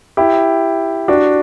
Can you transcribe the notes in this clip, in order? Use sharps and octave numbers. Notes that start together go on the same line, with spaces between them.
E4 G4
D4 F#4